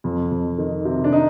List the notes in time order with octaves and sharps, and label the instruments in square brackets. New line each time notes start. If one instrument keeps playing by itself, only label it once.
[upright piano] F2
F2
D#3
C3
D4
D#4